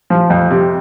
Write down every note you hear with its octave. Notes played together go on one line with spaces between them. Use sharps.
F3
F2
C3